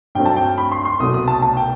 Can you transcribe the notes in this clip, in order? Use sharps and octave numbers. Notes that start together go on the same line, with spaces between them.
G2 F#3 A3 C4 G5
A5
G5
B5
C6
C6
C2 B2 F#3 A3 D#6
D#6
A5
A5
G5